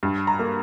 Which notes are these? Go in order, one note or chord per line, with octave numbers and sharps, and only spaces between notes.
G2
A#5
A#3